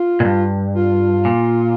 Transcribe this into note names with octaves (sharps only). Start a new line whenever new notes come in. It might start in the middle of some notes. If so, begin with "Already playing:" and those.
Already playing: F4
A#2
G2
F4
A#2